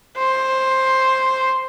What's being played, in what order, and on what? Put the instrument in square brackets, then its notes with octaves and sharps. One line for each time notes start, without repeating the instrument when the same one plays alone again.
[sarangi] C5